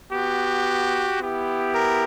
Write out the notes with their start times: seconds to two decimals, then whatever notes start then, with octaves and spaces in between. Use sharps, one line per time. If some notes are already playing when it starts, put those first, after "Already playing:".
0.12 B3 F#4 G4
1.19 B3 E4 G4
1.73 A#4